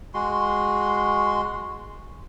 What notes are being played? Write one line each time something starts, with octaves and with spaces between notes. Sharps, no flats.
G#3 F#4 C6